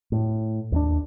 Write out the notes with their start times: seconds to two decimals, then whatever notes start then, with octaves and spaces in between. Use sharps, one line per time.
0.12 A2
0.72 D#2 A3 D4